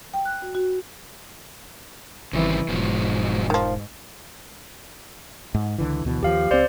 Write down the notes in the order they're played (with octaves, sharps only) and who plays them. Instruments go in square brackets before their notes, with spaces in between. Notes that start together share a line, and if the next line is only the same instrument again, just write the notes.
[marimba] G5
F#6
F#4
F#4
[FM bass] G#1 [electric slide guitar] C#3 G3 C4 [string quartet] E3
[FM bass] E1 [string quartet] G#2 [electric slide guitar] B2 F3 F#3
[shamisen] D#3 F3
[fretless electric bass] G#2
C#2 D3 E3
D2 B2 E3
[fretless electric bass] D#2 F3 [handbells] G4 F5
[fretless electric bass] C#2 C4 [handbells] C5 D5